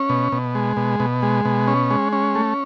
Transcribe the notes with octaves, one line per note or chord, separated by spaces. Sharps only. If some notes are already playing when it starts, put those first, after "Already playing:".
Already playing: C#4
B2
B2
G#3
B2
B2
G#3
B2
C#4
G#3
C#4
A3